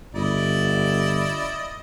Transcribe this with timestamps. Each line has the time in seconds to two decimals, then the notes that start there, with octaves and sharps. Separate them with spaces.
0.15 G1 E4 D5 D#5